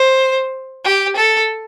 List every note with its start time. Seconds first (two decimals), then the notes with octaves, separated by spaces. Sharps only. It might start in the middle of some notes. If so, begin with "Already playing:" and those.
Already playing: C5
0.85 G4
1.16 A4